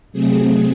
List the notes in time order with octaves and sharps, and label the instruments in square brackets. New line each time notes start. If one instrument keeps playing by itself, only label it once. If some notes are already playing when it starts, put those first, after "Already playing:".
[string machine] C3 F#3 A3 C4 G#4